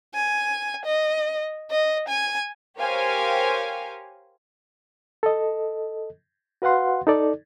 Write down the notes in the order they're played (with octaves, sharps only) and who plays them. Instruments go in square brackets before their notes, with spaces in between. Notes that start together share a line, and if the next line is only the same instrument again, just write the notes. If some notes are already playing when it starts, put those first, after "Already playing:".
[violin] G#5
D#5
D#5
G#5
[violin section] G4 A#4 C5 C#5 F5 G#5
[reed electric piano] A4 D#5
F#4 B4 F5 F#5 C6
D#4 A4 D5